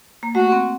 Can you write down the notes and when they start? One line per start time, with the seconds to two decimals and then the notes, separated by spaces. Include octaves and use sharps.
0.23 A#3
0.35 A3 F#4
0.52 C4